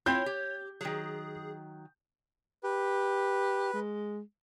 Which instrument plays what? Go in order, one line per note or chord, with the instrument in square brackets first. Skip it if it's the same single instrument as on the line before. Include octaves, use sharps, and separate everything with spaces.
[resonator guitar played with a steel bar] C4 E4 F4 [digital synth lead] C#5 [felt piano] G6
[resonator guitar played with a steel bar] G4
[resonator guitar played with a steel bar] D#3 F#3 [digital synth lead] G#4
[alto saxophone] G4 [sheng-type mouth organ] B4
[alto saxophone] G#3